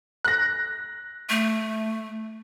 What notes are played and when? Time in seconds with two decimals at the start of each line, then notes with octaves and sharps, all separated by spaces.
0.25 F#6 A#6
1.29 A3